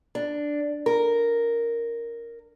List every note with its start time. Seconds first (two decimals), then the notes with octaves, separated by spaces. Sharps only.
0.15 D4
0.86 A#4